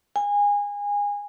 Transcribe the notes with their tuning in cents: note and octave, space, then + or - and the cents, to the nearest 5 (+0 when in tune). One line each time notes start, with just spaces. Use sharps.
G#5 -25